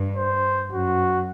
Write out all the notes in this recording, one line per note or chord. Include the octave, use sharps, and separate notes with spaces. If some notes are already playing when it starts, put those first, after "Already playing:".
Already playing: G2
C5
F#2 F#4